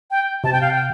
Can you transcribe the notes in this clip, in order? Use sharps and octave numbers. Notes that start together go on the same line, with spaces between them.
G5
C3 A5
G5
F5
G5